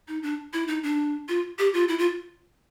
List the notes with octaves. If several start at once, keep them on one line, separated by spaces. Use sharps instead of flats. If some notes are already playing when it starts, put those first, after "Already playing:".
D#4
D4
E4
D#4
D4
F4
G4
F4
E4
F4